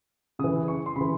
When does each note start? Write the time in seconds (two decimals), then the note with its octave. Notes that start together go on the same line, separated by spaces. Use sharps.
0.39 C#3 D#6
0.44 E3
0.68 C#6
0.86 C6
0.96 C#3 E3 B5